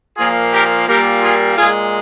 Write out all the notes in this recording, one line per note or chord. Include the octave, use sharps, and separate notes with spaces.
A#2 F3 A#3 F4 G#4
G4 A#4
A#2 G3 A#3 G4 A#4
F4 G#4
A#2 G#3 F4 G#4